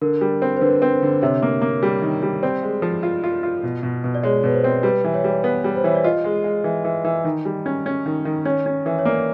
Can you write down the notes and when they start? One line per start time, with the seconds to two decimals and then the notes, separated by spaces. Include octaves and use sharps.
0.01 D3 A#4
0.21 G3
0.42 C4
0.57 C5
0.61 D3 B4
0.82 C4
1.02 D3
1.22 C3 C#5
1.42 A#3
1.62 A#3
1.83 G3
2.02 D#3
2.23 G3
2.43 C4 D5
2.63 G#3
2.82 F3
3.03 F4
3.24 F4
3.43 F4
3.64 B2
3.83 B2
4.04 B2
4.14 D5
4.23 G#3 C#5
4.44 B2 B4
4.54 C5
4.64 C4
4.83 G3 B4
5.04 E3
5.14 C#5
5.24 G3 C#5
5.44 B3
5.64 G3
5.76 C5
5.84 E3 C#5
5.95 D5
6.04 F4 D#5
6.24 G#3
6.44 G#3
6.64 E3
6.85 E3
7.04 E3
7.24 D#3
7.45 G3
7.66 C#4
7.86 C#4
8.06 D#3
8.25 D#3
8.45 C#4 C#5
8.66 C#4
8.86 E3
8.99 C#5
9.05 A#3 D5